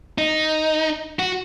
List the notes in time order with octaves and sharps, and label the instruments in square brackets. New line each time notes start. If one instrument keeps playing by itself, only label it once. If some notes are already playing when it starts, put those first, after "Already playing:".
[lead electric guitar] D#4
F#4